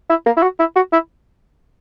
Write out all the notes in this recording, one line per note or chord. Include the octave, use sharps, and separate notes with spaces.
E4
A#3
E4
F#4
E4
F#4
E4